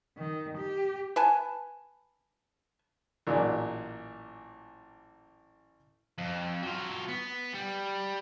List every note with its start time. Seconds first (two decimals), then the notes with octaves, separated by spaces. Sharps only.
0.17 D#3
0.58 G4
1.16 B4 G#5 A5
3.27 A1 A#2 F#3 G#4
6.18 F2
6.63 F#3 F4
7.08 B3
7.53 G3